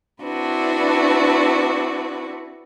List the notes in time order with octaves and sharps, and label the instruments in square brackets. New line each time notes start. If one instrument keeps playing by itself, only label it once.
[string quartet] C4 D4 E4 F#4 B4